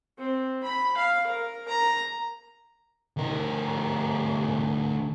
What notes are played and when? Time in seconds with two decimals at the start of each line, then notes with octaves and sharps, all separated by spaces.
0.18 C4
0.64 B5
0.97 F5
1.27 A#4
1.69 A#5
3.17 D2 A#4